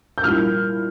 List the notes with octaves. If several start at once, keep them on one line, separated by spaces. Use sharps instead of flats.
G6
A#2 G3 A#3 E4 F6